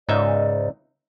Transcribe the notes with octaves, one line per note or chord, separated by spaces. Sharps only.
C#2 G#2 D#4 D5 E5